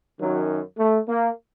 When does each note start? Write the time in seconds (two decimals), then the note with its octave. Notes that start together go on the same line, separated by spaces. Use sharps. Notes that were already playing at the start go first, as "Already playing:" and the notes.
0.19 F#2 D#3 F#3
0.78 A3
1.08 A#3